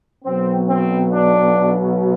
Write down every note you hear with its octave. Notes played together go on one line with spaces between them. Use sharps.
B1 B2 F#3 C4
C4
D4